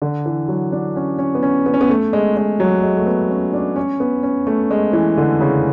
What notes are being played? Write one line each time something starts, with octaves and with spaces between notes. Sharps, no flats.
D3
E3
F#3
D4
C#4
C#4
B3
C#4
B3
C#4
B3
A3
G#3
G#3
F#3
G#3
A3
B3
C#4
D4
C#4
B3
C#4
A3
G#3
E3
D3
C#3